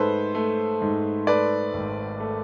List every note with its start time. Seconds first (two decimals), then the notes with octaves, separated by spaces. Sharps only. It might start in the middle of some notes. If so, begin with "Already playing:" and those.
Already playing: G#2 A3 A4 B4 C5
0.35 A3
0.82 G#2
1.27 A3 B4 D5
1.74 G#1
2.20 A3